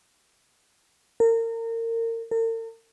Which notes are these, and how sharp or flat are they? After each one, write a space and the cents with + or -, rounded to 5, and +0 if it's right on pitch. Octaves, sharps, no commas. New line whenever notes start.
A#4 -30
A#4 -45